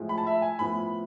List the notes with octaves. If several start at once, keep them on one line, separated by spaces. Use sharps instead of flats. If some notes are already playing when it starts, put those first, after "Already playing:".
Already playing: A2 F3 G#3
B5
A5
E5
G#5
A2 F3 B3 B5